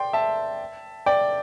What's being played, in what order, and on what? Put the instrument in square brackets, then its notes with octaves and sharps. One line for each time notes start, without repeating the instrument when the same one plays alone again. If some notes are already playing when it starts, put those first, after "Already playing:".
Already playing: [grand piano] D5 G5 C6
E5 A5
D5 G5